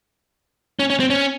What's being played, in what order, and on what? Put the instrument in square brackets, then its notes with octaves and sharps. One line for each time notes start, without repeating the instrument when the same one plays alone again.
[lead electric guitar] C#4
C#4
C4
C#4